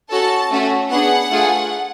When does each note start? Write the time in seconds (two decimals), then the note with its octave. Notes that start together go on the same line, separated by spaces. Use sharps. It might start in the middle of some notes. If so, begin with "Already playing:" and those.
0.10 C#4 F#4 A4 A5
0.51 A3 C#4 F#4 A4
0.90 B3 D4 G#4 F#5
1.31 A3 F4 G#4